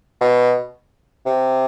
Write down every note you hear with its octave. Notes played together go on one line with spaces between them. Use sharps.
B2
C3